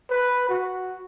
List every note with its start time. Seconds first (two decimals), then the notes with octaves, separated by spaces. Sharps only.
0.10 B4
0.49 F#4